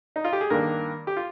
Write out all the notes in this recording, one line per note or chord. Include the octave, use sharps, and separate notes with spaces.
D#4
F4
G4
G#4
G2 D#3 A#3 D4 A#4
G4
F4